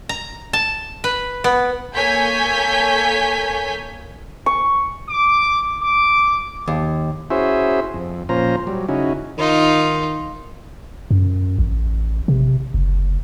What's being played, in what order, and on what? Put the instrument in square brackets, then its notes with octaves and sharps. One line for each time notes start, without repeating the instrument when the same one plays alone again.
[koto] A#5
A5
B4
B3
[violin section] A#3 A4 C#5 G#5 G6 B6
[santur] C#6
[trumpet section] D6
D6
[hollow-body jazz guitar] D#2
[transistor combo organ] C#4 E4 F#4 G#4 C5 E5
F2
A#2 F3 C#4 C5 A#5
F#3 G3
C#3 C#4 D#4 E4 F#4
[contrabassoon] D#3 [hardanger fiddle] D#4 F4
[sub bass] F#2
A1
C3
F#1